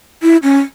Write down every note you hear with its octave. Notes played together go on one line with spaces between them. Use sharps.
E4
C#4